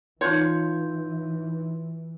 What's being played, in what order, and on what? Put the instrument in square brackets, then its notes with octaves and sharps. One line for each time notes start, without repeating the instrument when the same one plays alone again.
[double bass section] E3 [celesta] D#4 C6 G6 [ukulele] F4 C#5